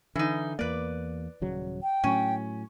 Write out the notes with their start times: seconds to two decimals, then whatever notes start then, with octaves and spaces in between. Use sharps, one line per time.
0.15 D3 E3 D#4
0.59 E2 A#3 B4 D5
1.42 D#1 C#3 F#3
1.83 G5
2.04 A2 F#3 C#4